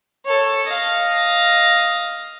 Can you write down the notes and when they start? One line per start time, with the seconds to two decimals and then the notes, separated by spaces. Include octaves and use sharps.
0.25 A4 C#5
0.66 D#5 F5